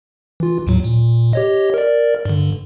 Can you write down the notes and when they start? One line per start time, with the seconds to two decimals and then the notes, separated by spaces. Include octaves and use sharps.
0.40 E3 F4
0.67 D#2 A2 F#3
0.84 A#2
1.33 G4 C#5 D#5
1.74 A#4 D5
2.25 G2 D3